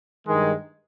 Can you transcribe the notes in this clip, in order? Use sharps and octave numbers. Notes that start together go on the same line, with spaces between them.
G2 D#3 G#3